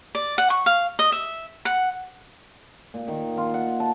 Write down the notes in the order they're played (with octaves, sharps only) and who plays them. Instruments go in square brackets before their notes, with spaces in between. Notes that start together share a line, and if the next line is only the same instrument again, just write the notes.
[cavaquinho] D5
F#5
C#6
F5
D#5
E5
F#5
[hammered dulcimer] A#2
D#3
F4
F#5
A5